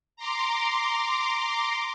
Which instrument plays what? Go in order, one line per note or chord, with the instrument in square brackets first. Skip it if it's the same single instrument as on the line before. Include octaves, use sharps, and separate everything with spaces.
[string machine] A#5 C6 D6